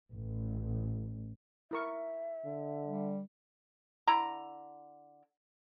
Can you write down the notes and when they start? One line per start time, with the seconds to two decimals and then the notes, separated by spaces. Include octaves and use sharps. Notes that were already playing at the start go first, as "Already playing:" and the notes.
0.11 A1
1.71 E4 A#4 E5 C#6
2.45 D3
2.84 G3
4.07 D3 E4 A#5